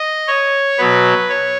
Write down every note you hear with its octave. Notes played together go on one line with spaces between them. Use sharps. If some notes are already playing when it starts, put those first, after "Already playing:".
Already playing: D#5
C#5
B2 F#3 B3 B4
C#5